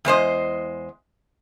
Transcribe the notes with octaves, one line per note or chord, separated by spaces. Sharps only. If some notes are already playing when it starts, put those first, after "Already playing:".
E2 G#3 C5 D#5